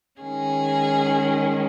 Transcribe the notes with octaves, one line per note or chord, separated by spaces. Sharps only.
D#3 G#3 C#4 G#4